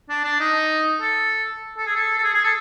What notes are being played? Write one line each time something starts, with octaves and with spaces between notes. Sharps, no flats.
D4
D4
D#4
A4
A4
G#4
A4
A4
G#4
G#4
A4